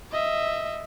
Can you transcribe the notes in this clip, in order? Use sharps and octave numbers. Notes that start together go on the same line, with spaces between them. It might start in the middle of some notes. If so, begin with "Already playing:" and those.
D#5 E5